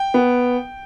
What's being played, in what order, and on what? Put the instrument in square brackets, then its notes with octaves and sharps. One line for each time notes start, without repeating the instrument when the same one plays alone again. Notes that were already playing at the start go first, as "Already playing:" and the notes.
Already playing: [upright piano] G5
B3